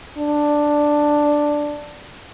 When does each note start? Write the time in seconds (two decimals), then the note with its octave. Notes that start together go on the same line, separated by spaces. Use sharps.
0.18 D4